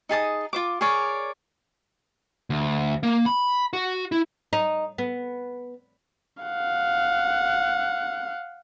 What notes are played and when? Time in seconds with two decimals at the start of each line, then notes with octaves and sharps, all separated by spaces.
0.09 D#4 G#4 A5 D#6
0.53 F4 C5 D6
0.81 G#4 A#4 C#5 D5
2.50 D2
3.03 A#3
3.26 B5
3.73 F#4
4.12 E4
4.53 D#4
4.98 B3
6.43 F5 F#5